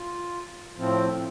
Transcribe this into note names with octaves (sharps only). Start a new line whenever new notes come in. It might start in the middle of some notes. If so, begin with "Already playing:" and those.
Already playing: F4
A2 F3 C4